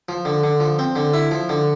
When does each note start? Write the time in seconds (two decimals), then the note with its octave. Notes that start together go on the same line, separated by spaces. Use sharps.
0.09 F3
0.25 D3
0.43 D3
0.60 F3
0.79 C4
0.96 D3
1.13 E4
1.31 F3
1.49 D3